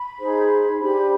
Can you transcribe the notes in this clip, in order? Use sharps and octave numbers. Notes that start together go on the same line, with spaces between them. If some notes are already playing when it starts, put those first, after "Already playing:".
Already playing: B5
D#4 G#4 C5
D4 G4 C5 B5